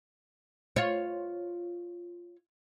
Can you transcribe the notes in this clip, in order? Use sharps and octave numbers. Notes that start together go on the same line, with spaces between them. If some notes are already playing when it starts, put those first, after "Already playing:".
F4 C#5